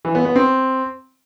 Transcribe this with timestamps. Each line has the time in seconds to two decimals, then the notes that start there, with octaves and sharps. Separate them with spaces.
0.05 E3
0.15 B3
0.25 B3
0.36 C4